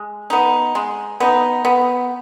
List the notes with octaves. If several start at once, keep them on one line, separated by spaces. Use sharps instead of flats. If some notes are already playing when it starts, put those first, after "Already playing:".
Already playing: G#3
B3 D#4
G#3
B3 D#4
B3